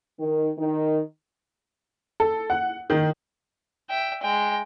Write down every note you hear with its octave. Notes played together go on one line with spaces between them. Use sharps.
D#3
D#3
A4
F#5
D#3
E5 G5
G#3 G5